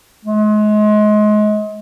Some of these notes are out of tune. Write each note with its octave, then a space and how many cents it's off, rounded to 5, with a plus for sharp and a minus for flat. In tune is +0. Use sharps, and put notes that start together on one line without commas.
G#3 +30